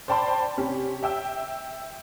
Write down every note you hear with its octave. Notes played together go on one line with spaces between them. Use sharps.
C5 D5 G5 A5 B5 C6
C3 C#4 G4
E5 G5 E6